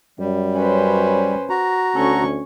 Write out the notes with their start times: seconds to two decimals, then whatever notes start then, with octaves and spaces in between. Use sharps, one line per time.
0.19 F#2 G3
0.55 C#4 B4 C5
1.50 F#4 A#5
1.96 D2 C#4 A4 C#6